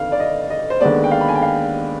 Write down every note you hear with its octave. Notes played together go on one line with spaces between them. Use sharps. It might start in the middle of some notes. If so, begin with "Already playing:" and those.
Already playing: G1 F2 D#3 F5
D5
D#5
D#5
C5
D#2 D3 G#3 B3 D5
G5
F5
B5
G#5
G5
F5